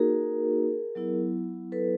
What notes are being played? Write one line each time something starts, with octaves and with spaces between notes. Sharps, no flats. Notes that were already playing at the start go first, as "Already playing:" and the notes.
Already playing: A#3 D#4 F#4 G#4 A#4
F#3 B3 E4
A4 B4